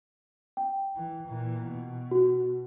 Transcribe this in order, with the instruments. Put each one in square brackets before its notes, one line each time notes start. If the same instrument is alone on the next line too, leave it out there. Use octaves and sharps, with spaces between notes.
[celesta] G5
[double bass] E3
A#2 E3
B2
[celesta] F#4